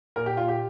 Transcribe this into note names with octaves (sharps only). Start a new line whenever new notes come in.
A#2 A#4
G4
A#2 F4
G4